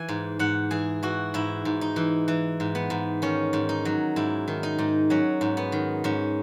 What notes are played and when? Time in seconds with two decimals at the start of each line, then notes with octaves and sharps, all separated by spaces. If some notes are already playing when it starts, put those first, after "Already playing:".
Already playing: E3 G#5
0.09 G#2
0.39 G#2 F#5
0.71 E3 G#4
1.03 E3 F#4
1.34 G#2 E4
1.65 G#2
1.81 D#4
1.96 E3
2.28 E3
2.60 G#2
2.75 B3
2.90 G#2
3.22 D#3 C#4
3.53 G#2
3.69 D#4
3.85 F#3
4.16 G#2 E4
4.48 D#3
4.63 D#4
4.79 G#2
5.10 F#3 C#4
5.41 G#2
5.57 B3
5.72 D#3
6.04 G#2 C#4